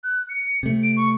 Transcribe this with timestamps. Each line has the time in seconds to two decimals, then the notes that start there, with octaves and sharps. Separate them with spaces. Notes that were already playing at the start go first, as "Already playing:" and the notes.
0.04 F#6
0.29 C#7
0.63 C3 A3
0.83 D7
0.97 C#6